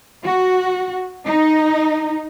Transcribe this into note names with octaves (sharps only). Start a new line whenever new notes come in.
F#4
D#4